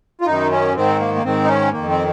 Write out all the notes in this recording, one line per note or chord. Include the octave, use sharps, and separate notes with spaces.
F4
F#2 D#3 D#4
C#4
G#2 D#3 C4
A#3
A#3
G#2 D#3 C4
D#4
C#4
F2 D#3 A#3
C4